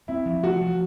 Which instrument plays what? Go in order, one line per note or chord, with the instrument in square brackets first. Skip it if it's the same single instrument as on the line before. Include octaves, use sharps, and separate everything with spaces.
[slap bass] C4 [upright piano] E4
[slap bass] F3
[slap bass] A3 [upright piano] F#4
[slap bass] F3